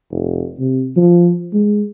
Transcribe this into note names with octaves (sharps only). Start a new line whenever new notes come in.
F1
C3
F3
G#3